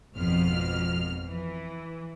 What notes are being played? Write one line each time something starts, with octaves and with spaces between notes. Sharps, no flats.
G#1 F2 B2 F6
E3